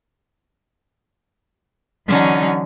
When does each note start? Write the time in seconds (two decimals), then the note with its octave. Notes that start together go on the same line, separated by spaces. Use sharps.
2.06 D3 E3 F#3 C#4 D#4 F#4